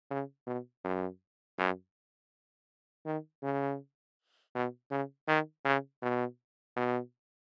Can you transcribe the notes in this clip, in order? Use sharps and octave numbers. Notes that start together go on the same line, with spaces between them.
C#3
B2
F#2
F#2
D#3
C#3
B2
C#3
D#3
C#3
B2
B2